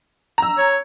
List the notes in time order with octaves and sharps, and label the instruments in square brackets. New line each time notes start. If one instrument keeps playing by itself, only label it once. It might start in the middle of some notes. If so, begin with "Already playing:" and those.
[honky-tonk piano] A#5 E6
[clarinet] C#5